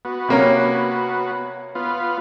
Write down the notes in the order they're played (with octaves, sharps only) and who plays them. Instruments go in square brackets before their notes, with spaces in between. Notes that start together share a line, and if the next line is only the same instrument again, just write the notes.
[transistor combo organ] B3 F#4
[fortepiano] C3 A#3 C#4
[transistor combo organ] B3 F4